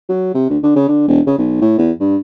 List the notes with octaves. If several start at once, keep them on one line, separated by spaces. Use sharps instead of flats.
F#3
C3
D2
D3
C#3
D3
E1
C#3
B1
A2
E2
G2